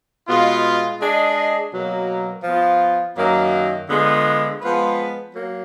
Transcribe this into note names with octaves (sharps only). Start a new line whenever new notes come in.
B2 G#3 B3 F4
G#3 D4 G#4 D#5
B2 F#3 A#3
F3 B3 F4
F#2 D#3 F#3 A#3
D3 G#3 B3 F4 G#4
F3 G#3 B3 F4 B4
F#3 A#3